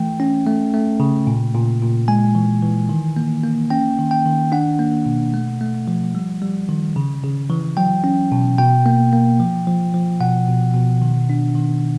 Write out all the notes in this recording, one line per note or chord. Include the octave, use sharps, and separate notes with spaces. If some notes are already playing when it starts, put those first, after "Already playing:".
Already playing: E3 A3 G5
C#4
A3
A3
C#3
A#2
A#2
A#2
G#3 G#5
E3
E3
D#3
A#3
A#3
C#4 G5
D#3
G5
D#3
D4 F#5
A#3
B2
A3
A3
F3
G3
G3
D#3
C#3
C#3
E3
F#3 G5
C#4
B2
B2 G5
A#3
A#3
F3
F3
F3
B2 F#5
B2
B2
D#3
D4
D#3